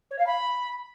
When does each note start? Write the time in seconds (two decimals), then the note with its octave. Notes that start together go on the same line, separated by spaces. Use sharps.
0.11 C#5
0.19 F5
0.27 B5